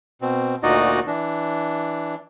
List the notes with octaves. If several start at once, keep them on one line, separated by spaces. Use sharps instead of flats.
B2 C4
D2 A#2 D#4 F#4 D5 D#5
E3 D4